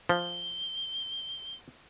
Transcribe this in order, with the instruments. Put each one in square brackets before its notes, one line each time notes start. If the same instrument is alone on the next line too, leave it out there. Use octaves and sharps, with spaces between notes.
[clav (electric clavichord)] F3 [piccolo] G7